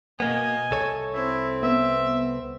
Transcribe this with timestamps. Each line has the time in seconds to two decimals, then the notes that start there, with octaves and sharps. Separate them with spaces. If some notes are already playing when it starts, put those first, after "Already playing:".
0.20 B2 A#3 B3 D#5 G#5
0.71 C2 A4 C#5
1.14 C4 E4
1.63 B3 E5